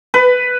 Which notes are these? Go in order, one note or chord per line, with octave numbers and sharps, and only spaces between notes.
B4